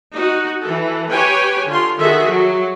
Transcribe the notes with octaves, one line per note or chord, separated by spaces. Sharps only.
D#4 F#4
E3 A4
G4 B4 C#5 G5 G#5
D3 F4 C6
D#3 F#4 G#4 A4 E5
F#3